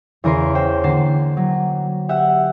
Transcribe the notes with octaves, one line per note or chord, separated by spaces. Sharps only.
E2 C#3 A#4 B4 C6
C#4 A#4 C5 G5
D3 A#3 A6 C7 E7
F#3
G4 E5 F#5